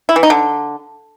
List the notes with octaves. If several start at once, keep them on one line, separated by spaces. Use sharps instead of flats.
E4
E3
D#4
D3